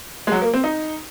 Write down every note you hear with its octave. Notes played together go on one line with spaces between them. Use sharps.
G#3
F#3
A#3
C4
D#4